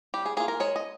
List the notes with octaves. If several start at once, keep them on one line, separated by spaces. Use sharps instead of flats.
G3 G4
G#4
A#3 F4 G#4
A#4
G#3 C#5
D#5